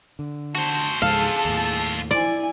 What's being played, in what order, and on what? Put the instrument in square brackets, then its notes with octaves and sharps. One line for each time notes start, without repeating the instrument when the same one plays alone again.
[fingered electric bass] D3
[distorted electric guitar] F#4 C5 [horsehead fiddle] A5
[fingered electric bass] C#2 G#2 [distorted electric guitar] F4 A4 [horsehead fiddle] G#4 A5 [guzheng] F5
[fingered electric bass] D#2 A2
[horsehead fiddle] E4 G#5 [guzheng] D5